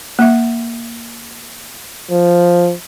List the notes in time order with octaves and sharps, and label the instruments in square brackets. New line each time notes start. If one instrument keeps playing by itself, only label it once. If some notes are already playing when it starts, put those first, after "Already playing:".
[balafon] A#3 E5
[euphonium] F3